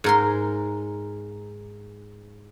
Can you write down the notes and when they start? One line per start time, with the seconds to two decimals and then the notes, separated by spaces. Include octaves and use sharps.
0.04 G#2 A#4 C6